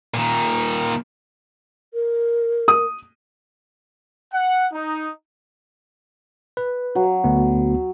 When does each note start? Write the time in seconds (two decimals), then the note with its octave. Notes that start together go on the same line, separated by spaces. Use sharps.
0.14 A#2 D#3
1.94 A#4
2.68 D#6
4.33 F#5
4.73 D#4
6.57 B4
6.95 F#3
7.24 D2 B3